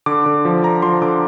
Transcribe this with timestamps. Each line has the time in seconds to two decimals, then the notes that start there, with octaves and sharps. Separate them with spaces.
0.06 D3 D6
0.26 D3
0.45 F3
0.64 D3 A#5
0.82 F3 C6
1.02 D3 D6